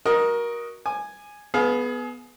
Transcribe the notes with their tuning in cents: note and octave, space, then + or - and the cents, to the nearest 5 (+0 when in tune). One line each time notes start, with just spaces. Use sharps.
F#4 +0 A#4 +20 D#5 +0
G#5 +0 D6 +45
B3 +0 G#4 +30 F5 +20